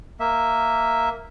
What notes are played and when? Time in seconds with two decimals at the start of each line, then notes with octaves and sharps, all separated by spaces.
0.20 A#3 E5